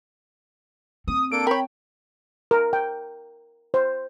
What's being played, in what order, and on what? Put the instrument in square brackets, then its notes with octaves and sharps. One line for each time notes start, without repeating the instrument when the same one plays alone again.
[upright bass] C4 [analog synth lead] D#6
[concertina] A#3 D4 A4 [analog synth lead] D7
[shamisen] A#4 C#5 [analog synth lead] G5 [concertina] B5
[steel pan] A#4
G5
C5